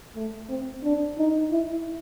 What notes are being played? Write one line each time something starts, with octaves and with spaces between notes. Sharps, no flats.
A3
C4
D4
D#4
E4